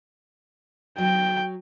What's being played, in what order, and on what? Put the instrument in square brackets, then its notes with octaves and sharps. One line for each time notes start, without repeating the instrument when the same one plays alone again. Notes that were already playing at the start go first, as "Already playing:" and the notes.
[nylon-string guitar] F#3 [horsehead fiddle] G5